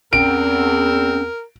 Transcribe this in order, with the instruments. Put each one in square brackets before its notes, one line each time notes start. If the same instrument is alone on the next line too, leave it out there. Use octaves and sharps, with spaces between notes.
[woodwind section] E2 C4 [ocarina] C#4 [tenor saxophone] A#4 [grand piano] D7